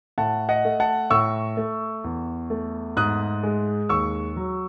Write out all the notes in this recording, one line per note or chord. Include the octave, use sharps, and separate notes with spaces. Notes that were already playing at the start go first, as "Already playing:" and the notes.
A2 F#5 A5
D#5 F#5
A3
F#5 A5
A2 C#6 E6
A3
E2
A3
G#2 D#6 F#6
G#3
D#2 C#6 E6
F#3